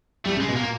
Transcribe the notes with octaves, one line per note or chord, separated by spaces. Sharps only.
G3 A3
C#3
G#3
B2
A#2 A#3